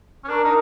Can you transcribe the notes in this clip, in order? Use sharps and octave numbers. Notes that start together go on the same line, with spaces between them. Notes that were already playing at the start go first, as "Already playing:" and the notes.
C#4
D4 A#4
D#4